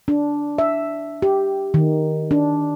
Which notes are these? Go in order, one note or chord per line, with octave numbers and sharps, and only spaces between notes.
D4
E5
G4
D#3
D4